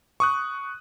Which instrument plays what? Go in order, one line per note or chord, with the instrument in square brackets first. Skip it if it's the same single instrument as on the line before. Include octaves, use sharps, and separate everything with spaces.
[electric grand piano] C#6 D#6 F#6